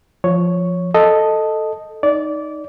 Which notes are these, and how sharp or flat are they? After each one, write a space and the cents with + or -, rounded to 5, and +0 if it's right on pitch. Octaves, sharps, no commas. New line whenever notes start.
F3 +0 C#5 +0
A4 +0 D#5 +0
D#4 +0 D5 -20